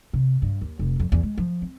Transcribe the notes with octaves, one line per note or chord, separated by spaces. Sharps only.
C3
G2
D#2
F1
F2
E2
G#3
F3
C4